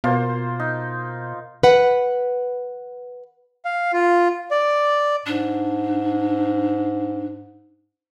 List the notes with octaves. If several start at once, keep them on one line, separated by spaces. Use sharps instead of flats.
B2 A#3 F4 C5
D#4
B4 F#5
F5
F4
D5
G#2 D4